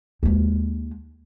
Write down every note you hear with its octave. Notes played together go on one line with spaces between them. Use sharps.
D#2 G#3